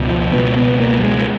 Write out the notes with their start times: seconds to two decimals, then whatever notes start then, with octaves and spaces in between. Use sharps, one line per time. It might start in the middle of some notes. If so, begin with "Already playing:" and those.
Already playing: C#2 B2
0.10 F3
0.33 C#2 B2 B3
0.57 B3
0.80 A#3
1.00 F#3
1.03 G#3